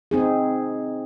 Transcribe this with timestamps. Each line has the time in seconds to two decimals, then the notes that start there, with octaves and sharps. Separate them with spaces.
0.11 C4 D#4 G#4